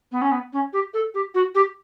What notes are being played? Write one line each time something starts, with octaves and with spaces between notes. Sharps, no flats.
B3
C#4
B3
C#4
G4
A4
G4
F#4
G4